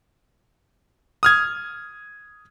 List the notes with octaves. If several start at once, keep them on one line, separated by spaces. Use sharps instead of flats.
D#6 F6 G#6